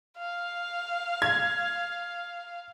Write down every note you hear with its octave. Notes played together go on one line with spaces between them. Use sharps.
F5
G#6